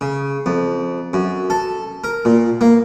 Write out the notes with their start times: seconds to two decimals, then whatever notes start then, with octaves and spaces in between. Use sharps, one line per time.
0.01 C#3
0.46 F2
1.13 F#2
1.50 A4
2.04 A#4
2.25 A#2
2.61 A#3